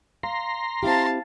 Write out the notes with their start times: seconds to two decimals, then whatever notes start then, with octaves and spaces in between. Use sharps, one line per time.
0.23 F5 A#5 C6
0.83 C4 E4 G4 F5 A5